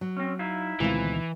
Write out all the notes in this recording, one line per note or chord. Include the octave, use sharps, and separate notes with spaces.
F#3
C4 C#4
D#4 E4 F5
D2 B2 D#3 E3 G#3 C4 F4